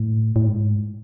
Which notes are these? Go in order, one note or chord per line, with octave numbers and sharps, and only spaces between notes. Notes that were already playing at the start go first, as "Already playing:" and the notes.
Already playing: A2
A2
G#2